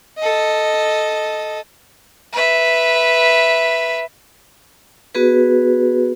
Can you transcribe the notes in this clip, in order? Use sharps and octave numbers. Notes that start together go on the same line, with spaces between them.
A4 D#5
B4 E5
B3 F#4 G#4 B4